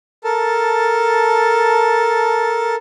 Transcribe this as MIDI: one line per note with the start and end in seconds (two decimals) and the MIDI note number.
0.24 2.75 69
0.24 2.75 70
0.24 2.75 81